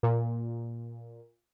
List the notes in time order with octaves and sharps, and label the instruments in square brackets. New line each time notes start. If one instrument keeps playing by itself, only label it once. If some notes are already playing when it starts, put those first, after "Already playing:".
[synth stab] A#2